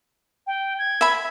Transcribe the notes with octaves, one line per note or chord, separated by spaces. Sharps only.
G5
G#6
E5 B5